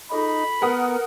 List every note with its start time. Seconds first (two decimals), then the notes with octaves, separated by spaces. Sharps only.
0.12 D#4 F4 G#4 A4 B5
0.62 B3 A#4 F#5 D#6